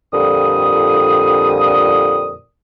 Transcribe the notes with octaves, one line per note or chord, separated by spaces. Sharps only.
F2 A#2 D3 G3 D#6